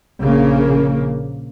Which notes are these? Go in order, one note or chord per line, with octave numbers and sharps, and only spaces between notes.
A#1 C#3 A#3